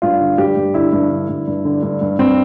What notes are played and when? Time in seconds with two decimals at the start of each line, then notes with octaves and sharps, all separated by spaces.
0.02 G2 F4
0.21 D3
0.38 G2 G4
0.57 G2
0.74 D3 E4
0.93 G2
1.11 D3
1.29 G2
1.47 G2
1.65 D3
1.83 G2
2.01 G2
2.19 G2 C4